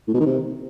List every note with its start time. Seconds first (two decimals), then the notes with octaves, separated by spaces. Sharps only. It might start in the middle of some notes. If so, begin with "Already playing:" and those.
0.08 A2
0.14 B2
0.20 D#3
0.26 C3